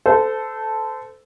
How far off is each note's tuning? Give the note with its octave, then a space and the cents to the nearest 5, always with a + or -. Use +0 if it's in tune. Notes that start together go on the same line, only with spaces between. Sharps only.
A4 -5 C5 -30